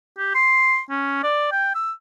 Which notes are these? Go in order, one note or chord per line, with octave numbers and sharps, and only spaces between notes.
G4
C6
C#4
D5
G5
E6